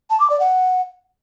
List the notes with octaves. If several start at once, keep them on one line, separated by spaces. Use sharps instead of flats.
A5
D6
D5
F#5